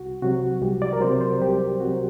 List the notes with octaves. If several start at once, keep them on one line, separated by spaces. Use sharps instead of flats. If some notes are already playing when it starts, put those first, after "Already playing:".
Already playing: C2 F#4
C3 F#3 F#4
C2 G4
D5
A#4
C3 F#3 C5
C5
C2 G4
C3 F#3 F#4